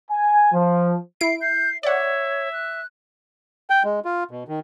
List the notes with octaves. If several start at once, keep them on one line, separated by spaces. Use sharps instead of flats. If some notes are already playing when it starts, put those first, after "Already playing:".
G#5
F3
E4 C7 D7
G6 C7
C#5 D5 E5 F#5
F#6
G5
G#3
F4
B2
D#3